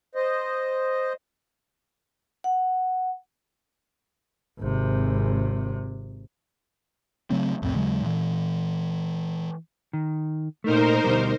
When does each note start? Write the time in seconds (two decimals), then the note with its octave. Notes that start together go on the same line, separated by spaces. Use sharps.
0.15 C5 D#5
2.44 F#5
4.59 G#1 C3
7.30 C#3 F#3 A3 C4
7.62 C2 F2 A2 C4
7.75 D#2 C#3 F#3 G#3
8.02 A#2 E3
9.93 D#3
10.64 A#2 A3 D#4 A#4 C5
11.04 D2 B2 G3